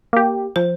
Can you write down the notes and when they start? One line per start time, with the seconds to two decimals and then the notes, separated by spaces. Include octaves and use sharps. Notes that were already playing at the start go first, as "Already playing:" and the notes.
0.13 A#3 G4
0.56 F3 C5